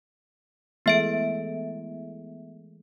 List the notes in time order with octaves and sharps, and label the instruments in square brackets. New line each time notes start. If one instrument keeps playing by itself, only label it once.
[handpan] E3 G#3 A3 [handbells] B3 E5 D7